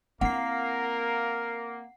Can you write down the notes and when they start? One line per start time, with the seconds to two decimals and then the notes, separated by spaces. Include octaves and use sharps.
0.21 A#3 C4 E4 A#4 F#5 C7